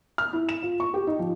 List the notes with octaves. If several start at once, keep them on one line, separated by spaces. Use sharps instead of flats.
F6
E4
E7
F4
C#6
G4
D#4
F3